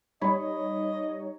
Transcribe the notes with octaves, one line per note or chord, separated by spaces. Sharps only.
G3 D#4 C#5 D#5 B5